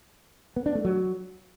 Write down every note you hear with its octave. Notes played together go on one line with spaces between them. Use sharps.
B3
D4
A3
F#3